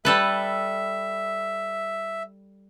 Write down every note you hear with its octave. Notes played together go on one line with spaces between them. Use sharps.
G3 A4 B4 E5